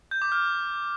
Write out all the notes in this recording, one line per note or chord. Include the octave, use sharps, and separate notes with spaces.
G6
D6
F6